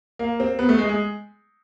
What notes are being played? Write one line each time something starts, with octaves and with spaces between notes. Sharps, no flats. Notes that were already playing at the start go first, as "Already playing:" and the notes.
A#3
C4
B3
A3
G#3
G#3